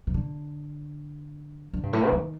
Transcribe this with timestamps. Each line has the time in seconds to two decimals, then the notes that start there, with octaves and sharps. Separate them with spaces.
0.07 C3
0.14 D3
1.73 D3
1.83 G2
1.93 A2
2.08 F3
2.12 D#3